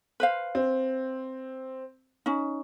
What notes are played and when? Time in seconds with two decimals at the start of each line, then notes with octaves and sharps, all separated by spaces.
0.20 B4 C5 F5
0.55 C4
2.26 C#4 D#4